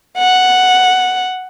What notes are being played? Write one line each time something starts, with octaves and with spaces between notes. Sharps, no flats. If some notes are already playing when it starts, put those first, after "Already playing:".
F#5